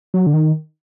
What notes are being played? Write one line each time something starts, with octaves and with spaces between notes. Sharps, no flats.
F#3
D3
D#3